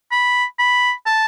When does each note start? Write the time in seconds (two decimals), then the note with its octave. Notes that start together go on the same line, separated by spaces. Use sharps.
0.12 B5
0.59 B5
1.06 A5